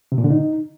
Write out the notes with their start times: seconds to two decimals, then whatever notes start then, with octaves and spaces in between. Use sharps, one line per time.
0.12 C3
0.18 A#2
0.24 D3
0.30 D#4